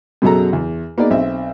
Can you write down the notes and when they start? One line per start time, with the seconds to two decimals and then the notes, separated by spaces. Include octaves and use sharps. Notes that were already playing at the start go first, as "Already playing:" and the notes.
0.22 F#2 B2 F#3 G#4 A4 A#5
0.53 E2
0.98 A#3 B3 D#4 G#4 D5
1.10 B1 C4 E5